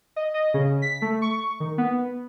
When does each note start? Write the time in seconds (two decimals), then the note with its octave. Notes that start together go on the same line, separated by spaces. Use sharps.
0.16 D#5
0.34 D#5
0.54 C#3
0.82 B6
1.02 A3
1.22 C#6
1.60 D#3
1.78 B3